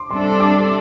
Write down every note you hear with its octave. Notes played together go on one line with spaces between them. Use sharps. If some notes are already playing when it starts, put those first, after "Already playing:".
Already playing: C6 D6
C3 G3 D4 A4 C6
D6